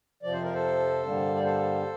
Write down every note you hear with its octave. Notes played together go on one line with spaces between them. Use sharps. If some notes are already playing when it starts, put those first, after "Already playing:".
F2 C3 F3 D5
C5
A#4
A4 C5
G2 D3 G3 A#3
D5
A4 C5